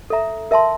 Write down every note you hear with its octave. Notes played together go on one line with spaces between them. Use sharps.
A4 E5 A#5
A#4 E5 A5 C6